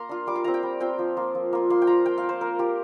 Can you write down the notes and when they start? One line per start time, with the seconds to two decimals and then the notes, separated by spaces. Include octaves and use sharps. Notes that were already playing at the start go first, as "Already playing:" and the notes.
Already playing: A#3 A#5 C6
0.09 D4 F4
0.27 G3 D6
0.36 C6
0.44 C4 F4 A#5
0.54 G5
0.63 G3
0.80 C4 F4 G5
0.99 F3
1.16 A#3 F4
1.35 F3
1.53 A#3 F4
1.70 A#3 C6
1.82 G5
1.87 F4 A#5
2.05 A#3 G5
2.18 F5
2.23 F4
2.29 C5
2.41 A#3 A#4
2.59 F4 G4